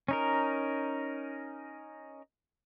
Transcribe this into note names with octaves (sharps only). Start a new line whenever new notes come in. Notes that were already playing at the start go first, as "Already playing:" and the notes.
C#4 D#4 A#4